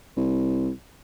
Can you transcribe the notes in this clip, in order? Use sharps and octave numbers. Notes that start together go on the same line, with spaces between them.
C2